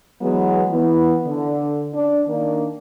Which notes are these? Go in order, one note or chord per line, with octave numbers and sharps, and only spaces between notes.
E3 F#3 G#3 B3
E3 B3
D3
D4
D#3 A#3 D4